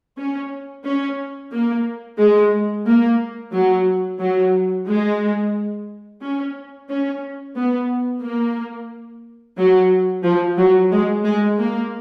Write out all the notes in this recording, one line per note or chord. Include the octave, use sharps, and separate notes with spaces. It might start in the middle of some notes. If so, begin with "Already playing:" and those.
C#4
C#4
A#3
G#3
A#3
F#3
F#3
G#3
C#4
C#4
B3
A#3
F#3
F3
F#3
G#3
G#3
A#3